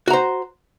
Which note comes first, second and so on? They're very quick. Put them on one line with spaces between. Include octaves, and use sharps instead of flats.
F#4 A#5 C5